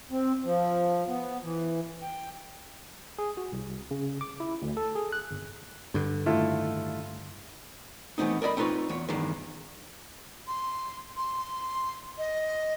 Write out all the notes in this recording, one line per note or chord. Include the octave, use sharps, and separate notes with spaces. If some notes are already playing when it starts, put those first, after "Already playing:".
C4
F3
B3
E3
G5
G#4
F#4
C2
C#3
D6
E4
D2
A4
G#4
F#6
G1
G2 D3
D#2 A2 E4 F4 A4
E3 A3 B3 C4 D#4
A#4 D5 D#5 B5
C4 D#4 F4 B4 C#5
E2 C#5
E2 G2 D#3 E3 G#3
C6
C6
D#5